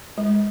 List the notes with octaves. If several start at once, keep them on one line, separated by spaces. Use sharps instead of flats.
G#3